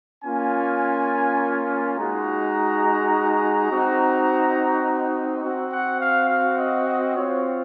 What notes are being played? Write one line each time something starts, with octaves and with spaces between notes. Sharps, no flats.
A#3 C#4 F4 G#5
G#3 D#4 F#4 A#5
C4 D#4 F#4
C4 F#4
F#5
F5
F5
D#5
D#5
C4 F4 C#5